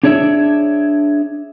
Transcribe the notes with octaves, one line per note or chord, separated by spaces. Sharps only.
D4 G#4 C#5 D5 E5